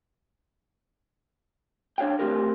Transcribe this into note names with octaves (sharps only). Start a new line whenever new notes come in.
D4 C#5 F5 G5
A3 A#3 C4 F4 G4 A#4